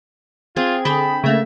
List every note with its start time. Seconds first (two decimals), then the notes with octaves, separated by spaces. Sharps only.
0.56 C4 F4 G#4 G#6
0.85 D3 G#4 G5 A5 B5
1.24 C#3 A3 A#3 E5